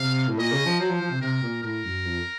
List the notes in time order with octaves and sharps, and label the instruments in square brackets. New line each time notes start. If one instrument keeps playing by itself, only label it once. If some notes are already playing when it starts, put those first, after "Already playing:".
Already playing: [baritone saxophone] C3 [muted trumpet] F5
[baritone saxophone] A2
[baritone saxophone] A#2 [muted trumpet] D#5
[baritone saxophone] C#3
F3
[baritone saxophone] F#3 [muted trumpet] C5
[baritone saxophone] F3
F3
C3
[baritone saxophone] C3 [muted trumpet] A#4
[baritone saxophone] A#2
[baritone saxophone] A2 [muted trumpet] A#4
[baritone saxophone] F#2
F2